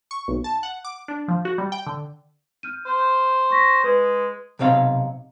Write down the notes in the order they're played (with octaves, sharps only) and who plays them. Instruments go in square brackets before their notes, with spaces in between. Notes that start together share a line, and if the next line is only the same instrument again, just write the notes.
[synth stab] C#6
B1
A5
F#5
D6
D4
F3
F#4
G3
G5
D3
[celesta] F6 G6 D#7
[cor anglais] C5
[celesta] C#6 A#6 B6
[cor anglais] G#3 [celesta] B4
[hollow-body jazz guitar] B1 C3 C4 C#5 F5